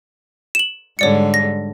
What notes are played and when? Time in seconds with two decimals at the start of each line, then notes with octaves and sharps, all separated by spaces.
0.55 E7 F#7
0.99 G#2 D3 G3 C#5 D5 C#7
1.34 A#6